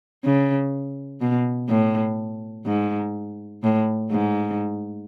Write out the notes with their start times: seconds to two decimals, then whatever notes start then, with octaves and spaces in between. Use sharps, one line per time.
0.24 C#3
1.21 B2
1.69 A2
2.66 G#2
3.63 A2
4.11 G#2